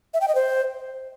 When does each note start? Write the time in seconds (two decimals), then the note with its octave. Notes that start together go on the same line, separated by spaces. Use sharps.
0.14 E5
0.21 G5
0.28 D#5
0.35 C5